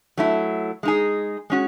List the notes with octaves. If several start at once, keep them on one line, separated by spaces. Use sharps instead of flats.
F#3 A3 E4
G#3 D#4 G#4
G#3 C#4 F#4